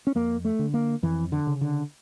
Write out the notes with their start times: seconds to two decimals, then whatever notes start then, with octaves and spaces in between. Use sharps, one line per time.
0.07 C#4
0.15 F2 A#3
0.45 A3
0.59 D3
0.74 A#3
1.03 F2 E3
1.32 D3
1.47 C#3
1.61 D3